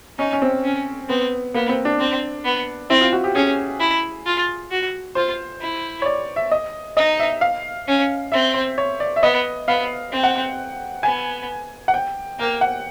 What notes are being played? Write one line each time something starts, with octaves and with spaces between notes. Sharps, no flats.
C#4 D#4
C#4
C4
C#4
B3 C4
A#3 B3
C4
D4
C4
B3
C4 E4
F4
F#4
G4
C#4 G#4
E4
F4
F#4
F4 C5
E4
C#5
D5
E5
D#5
D#4 D#5
E5
F5
C#4
C4 E5
C5
C#5
D5
E5
B3 D#5
B3 F5
C4 G5
F#5
G5
B3 G#5
F#5
G5
A#3 G5
F#5